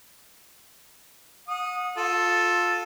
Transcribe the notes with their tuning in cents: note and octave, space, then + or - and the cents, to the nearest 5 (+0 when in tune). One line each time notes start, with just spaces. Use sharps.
F#5 -35 D#6 +0
F4 +20 A4 +0